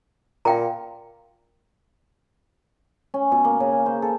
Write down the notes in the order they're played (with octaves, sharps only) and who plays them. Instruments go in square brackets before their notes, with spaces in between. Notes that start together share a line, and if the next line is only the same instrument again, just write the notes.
[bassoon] A#2 [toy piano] F5 G5 A#5
[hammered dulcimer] C#4
B2
A#3
C#3
G#5
C5
A4